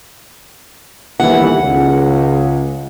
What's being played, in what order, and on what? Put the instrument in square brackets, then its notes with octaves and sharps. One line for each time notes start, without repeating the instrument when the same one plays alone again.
[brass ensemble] G1 D#2 E3 [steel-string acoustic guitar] F#5
[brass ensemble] C#2